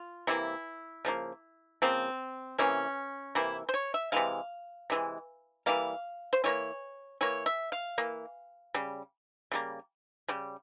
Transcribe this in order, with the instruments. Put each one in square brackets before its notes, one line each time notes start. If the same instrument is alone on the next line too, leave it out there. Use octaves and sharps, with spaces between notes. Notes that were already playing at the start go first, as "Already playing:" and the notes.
Already playing: [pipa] F4
C3 E3 A#3 E4
C#3 F3 A#3
C#3 F3 A#3 C4
C3 E3 A#3 C#4
C3 E3 A#3 E4
C5
C#5
E5
C3 E3 G#3 F5
C3 E3 G#3
E3 G3 A#3 F5
C5
E3 G3 A#3 C#5
E3 A#3 C#5
E5
F5
E3 A#3
C#3 G3
C#3 G3 A#3
C#3 G3